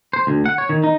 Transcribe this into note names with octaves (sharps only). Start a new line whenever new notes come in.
C5
D2
F#5
C#5
D#3
D#4